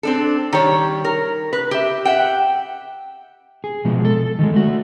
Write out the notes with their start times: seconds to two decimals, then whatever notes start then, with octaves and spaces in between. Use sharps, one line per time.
0.03 C4 D4 A4
0.53 D#3 G3 C#5
1.05 A#4
1.53 B4
1.71 G4 E5
2.05 E5 F#5 G5
3.64 G#4
3.85 B2 F3 G#3
4.05 A4
4.39 D#3 G3 G#3
4.53 A3 F#4